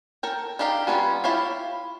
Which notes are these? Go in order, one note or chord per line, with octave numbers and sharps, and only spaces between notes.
A4 A#4 G5
D4 D#4 G4 F5 A#5
G3 B3 C#4 F4
E4 F4 G4 C#5 F5